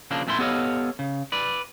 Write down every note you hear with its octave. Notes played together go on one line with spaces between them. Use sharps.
C#3 F3 A#3 D4
F2 A#2 A3 E4 C6
B3 G4 A4 C#5 D#5 F5
C#3
B4 D5